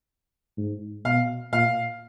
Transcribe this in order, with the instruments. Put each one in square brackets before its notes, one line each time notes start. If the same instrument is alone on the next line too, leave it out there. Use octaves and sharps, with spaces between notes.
[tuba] G#2
[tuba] B2 [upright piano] F5
[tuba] A#2 [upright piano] F5